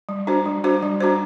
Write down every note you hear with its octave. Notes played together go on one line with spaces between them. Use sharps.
G3
D4 F#4 C5
G3
D4 F#4 C5
G3
D4 F#4 C5